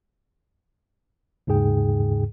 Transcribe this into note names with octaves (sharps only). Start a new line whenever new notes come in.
D#2 G#2 C#3 G#4 G5